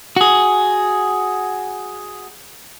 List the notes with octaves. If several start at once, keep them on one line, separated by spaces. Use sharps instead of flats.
F#4 G#4